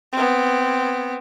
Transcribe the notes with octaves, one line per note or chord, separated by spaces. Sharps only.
B3 C4